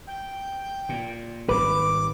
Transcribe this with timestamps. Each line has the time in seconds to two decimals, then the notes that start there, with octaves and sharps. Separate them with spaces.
0.07 G5
0.89 A#2
1.49 G#1 D#3 G3 B4 D6